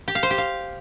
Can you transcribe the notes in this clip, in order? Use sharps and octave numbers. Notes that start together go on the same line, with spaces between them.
G4
F5
C5
G4
F5